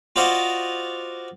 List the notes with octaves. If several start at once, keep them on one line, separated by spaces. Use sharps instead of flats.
F4 F#4 C5 D5 D#5 F5